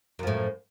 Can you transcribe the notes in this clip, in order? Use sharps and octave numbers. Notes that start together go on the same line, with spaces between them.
F#2 A2 F3